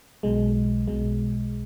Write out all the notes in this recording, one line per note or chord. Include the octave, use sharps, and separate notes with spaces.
B1 B2 G#3
B1 B2 G#3